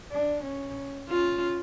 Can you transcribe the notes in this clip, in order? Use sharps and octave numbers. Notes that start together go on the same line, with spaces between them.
D4
C#4
C#4 F4